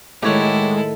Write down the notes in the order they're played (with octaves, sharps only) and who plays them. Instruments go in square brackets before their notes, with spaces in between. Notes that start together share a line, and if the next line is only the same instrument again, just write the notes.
[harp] A2 D#3 [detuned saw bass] G#3 [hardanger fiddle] E4 A4 [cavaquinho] G4 C#5 F#5